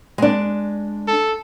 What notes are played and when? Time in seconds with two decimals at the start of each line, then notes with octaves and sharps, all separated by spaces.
0.18 G#3 D4
1.07 A4